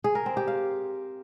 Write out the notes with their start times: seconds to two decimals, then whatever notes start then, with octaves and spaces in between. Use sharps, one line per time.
0.04 G#4
0.15 A#4
0.26 C4
0.37 G4
0.48 F5